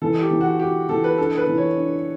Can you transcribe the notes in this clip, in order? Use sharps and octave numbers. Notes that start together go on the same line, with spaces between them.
E3 A4
G4
E3
F#4
F#4 G4
E3 A4
B4
D4 A4
B4
E3
C#5
D4